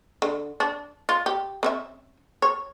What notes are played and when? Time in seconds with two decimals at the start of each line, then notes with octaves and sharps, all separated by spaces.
0.22 D3
0.60 D4
1.09 F4
1.26 G4
1.63 C4 C#4 E5
2.42 C#5